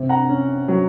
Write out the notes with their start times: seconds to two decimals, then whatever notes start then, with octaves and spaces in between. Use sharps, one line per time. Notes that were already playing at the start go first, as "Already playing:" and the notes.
Already playing: C3
0.09 F#5 A#5
0.29 C#4
0.68 F#3